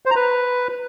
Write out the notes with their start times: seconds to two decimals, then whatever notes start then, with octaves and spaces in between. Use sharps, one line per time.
0.06 C5
0.11 A#5
0.16 B4